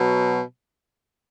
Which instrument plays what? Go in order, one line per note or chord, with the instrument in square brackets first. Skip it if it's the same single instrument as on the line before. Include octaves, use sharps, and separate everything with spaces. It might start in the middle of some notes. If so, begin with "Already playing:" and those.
Already playing: [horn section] B2 F#3